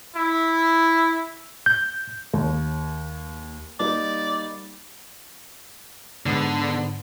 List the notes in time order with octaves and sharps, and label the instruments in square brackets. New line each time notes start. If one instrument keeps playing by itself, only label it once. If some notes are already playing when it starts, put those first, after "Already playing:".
[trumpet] E4
[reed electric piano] G6
[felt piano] D#2
[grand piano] G3 A#3 D#4 [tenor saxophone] D5
[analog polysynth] G#2 B3 [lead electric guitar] D3